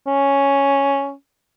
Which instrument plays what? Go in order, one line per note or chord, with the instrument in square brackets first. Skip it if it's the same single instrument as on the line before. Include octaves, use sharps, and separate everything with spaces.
[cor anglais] C#4